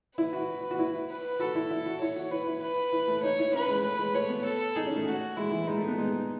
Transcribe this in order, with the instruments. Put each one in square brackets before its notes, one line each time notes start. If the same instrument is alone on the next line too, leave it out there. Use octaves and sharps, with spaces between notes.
[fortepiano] E4 [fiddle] B4
[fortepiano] F#4
F#4
E4
[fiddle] B4
[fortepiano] F#4 [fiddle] A4
[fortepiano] E4
E4
F#4
[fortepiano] E4 [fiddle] C#5
[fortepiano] F#4
[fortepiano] E4 [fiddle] B4
[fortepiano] E4
[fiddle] B4
[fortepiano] E4
A3
[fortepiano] D#4 [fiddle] C#5
[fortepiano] E4
[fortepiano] C#4 [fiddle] B4
[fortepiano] G#3
[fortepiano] A3 [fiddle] B4
[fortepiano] G#3
[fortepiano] A3 [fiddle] C#5
[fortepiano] B3
[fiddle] A4
[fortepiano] D#4 [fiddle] G#4
[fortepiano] C#4
A3
[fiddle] F#4
[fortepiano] G#3 [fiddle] E4
[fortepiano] E3
[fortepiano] G#3 [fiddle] D#4
[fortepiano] A3
B3
G#3